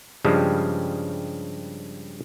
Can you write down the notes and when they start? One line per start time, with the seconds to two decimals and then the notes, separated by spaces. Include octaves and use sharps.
0.25 G2 C#3 F3 G3 G#3